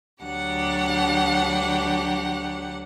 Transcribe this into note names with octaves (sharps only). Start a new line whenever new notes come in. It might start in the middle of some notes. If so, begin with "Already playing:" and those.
D2 F#3 D4 G4 F#5